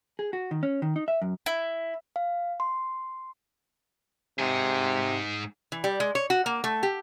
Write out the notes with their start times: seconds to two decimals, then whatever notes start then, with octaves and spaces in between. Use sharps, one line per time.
0.19 G#4
0.33 F#4
0.51 D#3
0.63 C#4
0.82 D#3
0.96 D#4
1.08 E5
1.22 F#2
1.46 E4
2.16 F5
2.60 C6
4.39 G#2 C3 G#4
5.72 E3
5.84 G3
6.00 G#3
6.15 C#5
6.30 F#4
6.46 A#3
6.64 A3
6.83 G4